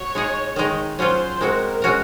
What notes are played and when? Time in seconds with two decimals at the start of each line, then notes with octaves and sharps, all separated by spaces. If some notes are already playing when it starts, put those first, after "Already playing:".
Already playing: F#4 C#5
0.15 G#3 D#4 G#4
0.56 D#3 G#3 D#4
0.99 F#3 C#4 F4 C5
1.40 G#3 C4 F#4 A#4
1.82 G#3 C#4 F#4 A#4